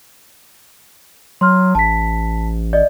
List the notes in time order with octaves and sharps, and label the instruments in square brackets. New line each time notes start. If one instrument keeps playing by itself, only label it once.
[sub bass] F#3 [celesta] C6 F6
[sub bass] A1 [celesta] A5 B6
[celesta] D5 D#5